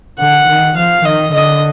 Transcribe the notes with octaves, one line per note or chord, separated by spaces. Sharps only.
D3 F#5
D#3
F3 F5
D#3 D#5
D3 D#5